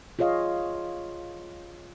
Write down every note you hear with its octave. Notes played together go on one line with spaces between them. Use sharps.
F4 G#4 C#5 D#5 F5